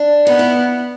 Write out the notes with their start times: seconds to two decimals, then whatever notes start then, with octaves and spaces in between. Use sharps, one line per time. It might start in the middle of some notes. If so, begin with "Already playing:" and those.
Already playing: D4
0.26 B3 D#4
0.39 E4